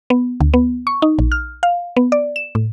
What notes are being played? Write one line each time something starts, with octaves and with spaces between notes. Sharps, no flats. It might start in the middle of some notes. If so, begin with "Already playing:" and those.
B3
D2
B3
C#6
D#4
A#1
F6
F5
B3
D5
E7
A2